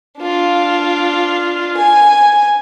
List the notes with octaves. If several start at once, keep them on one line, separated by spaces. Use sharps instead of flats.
D4 F4
G#5